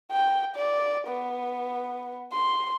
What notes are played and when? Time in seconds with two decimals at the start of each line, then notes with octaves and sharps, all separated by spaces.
0.12 G5
0.56 D5
1.08 B3
2.33 C6